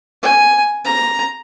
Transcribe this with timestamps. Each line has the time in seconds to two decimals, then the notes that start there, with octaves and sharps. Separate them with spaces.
0.23 G#5
0.85 A#5